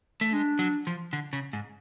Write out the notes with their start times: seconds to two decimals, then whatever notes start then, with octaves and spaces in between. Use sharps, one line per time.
0.21 A3
0.33 G#3 D4
0.59 F#3
0.87 F3
1.13 D3
1.33 C#3
1.53 G#2